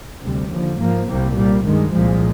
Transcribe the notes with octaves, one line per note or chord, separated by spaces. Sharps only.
D2 C3 G3
D#2 D3 F3
G#2 F3 A#3
C2 C3 G3 A#3
A#2 G3 A#3
G2 D#3 G#3
C2 A#2 F3 G#3